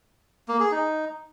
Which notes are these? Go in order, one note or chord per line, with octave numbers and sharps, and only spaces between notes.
A#3
G#4
D#4